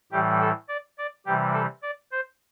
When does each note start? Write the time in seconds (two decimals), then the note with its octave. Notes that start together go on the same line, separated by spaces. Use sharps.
0.12 A2 E3 G3 G4
0.41 A4
0.69 D5
0.98 D5
1.26 C3 E3 G3 G4
1.54 A4
1.82 D5
2.12 C5